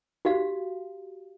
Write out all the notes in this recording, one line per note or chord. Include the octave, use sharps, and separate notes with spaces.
F#4 G4 F5